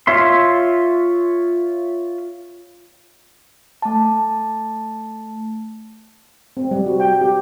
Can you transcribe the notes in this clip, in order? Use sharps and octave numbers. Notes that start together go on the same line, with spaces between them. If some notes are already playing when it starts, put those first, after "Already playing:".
F4 C#5 E5 C6
A3 A5
C4
G3
F#4
G5
G4